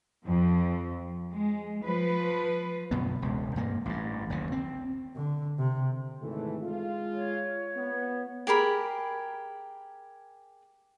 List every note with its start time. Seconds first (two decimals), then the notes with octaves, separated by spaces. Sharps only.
0.24 F2 F3
1.34 G#3
1.84 F3 B4
2.91 F#2 B2 D3 B3
3.22 E1 C#2
3.56 G2 A#3
3.86 A1 G2
4.30 F#1 D#2 C#3
4.52 C4
5.16 D3
5.59 C3
6.22 G#1 E3 A3
6.63 G#3 F4
7.14 C#5
7.77 B3
8.47 G4 G#4 A#4 B5